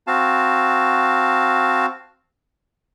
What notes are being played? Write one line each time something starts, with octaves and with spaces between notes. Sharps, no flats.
C4 F#4 F5 A5